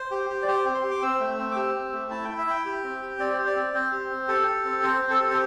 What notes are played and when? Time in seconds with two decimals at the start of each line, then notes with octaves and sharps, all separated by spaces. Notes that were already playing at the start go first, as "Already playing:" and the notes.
Already playing: C5
0.11 G4
0.29 G4
0.42 D5
0.48 G4 C5
0.65 C4
0.75 C6
0.84 G4
0.91 D6
1.02 C4 E6
1.20 A3
1.39 C4
1.51 D6
1.56 G4 E6
1.74 C4
1.92 A3
2.11 E4 A5
2.24 E4 G5
2.38 E5
2.47 E4 G5
2.65 G4
2.83 C4
3.01 G4
3.19 C4 D5
3.33 G4 C5
3.47 D5
3.56 C4
3.74 C4 C5
3.92 G4
4.10 C4
4.28 G4 A4
4.47 G4
4.65 C4
4.83 C4 C5
5.01 C4
5.10 A4
5.19 G4
5.30 C5